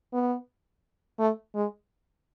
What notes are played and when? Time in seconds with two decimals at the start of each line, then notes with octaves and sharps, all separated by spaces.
0.13 B3
1.19 A3
1.55 G#3